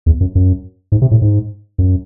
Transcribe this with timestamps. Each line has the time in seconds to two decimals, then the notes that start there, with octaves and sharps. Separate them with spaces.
0.06 E2
0.21 F#2
0.35 F#2
0.92 G#2
1.02 C3
1.11 A2
1.22 G#2
1.78 F#2